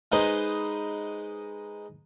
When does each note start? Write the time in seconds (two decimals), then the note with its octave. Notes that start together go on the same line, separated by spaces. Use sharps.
0.12 G#3 D#4 B4 C5 D#5